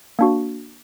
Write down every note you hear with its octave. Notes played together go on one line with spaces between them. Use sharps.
A#3 D4 F#4